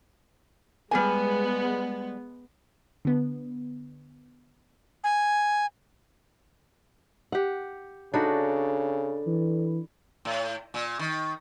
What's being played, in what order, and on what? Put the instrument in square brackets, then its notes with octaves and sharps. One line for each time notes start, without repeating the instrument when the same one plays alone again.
[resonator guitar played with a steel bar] G3 G#5 [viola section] G#3 B3
[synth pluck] D3 B3
[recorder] G#5
[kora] G4 F#5
[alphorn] C#3 [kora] D4 D#4 F#4 [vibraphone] A4 D5 B5
[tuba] E3
[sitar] A2
A#2
D#3